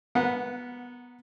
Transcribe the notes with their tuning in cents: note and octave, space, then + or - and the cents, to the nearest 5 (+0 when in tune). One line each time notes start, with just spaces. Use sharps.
B3 -5 A#4 +0 F#5 -20